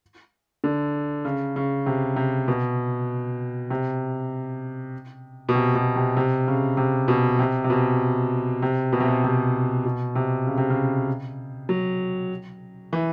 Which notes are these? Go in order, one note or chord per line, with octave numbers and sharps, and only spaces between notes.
D3
C#3
C#3
C3
C3
B2
C3
B2
C3
B2
C3
C3
C#3
C3
B2
C3
C3
B2
C3
B2
C3
B2
C3
B2
C3
C#3
C3
C#3
F#3
E3